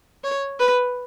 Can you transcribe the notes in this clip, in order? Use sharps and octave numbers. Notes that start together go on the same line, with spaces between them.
C#5
B4